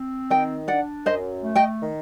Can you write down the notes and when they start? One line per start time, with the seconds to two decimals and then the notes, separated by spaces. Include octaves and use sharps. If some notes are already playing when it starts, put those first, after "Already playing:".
Already playing: C4
0.30 D#3 D#5 G5
0.68 D4 D5 F#5
1.05 F#2 C5 D#5
1.43 A3
1.55 D#5 G5
1.81 D#3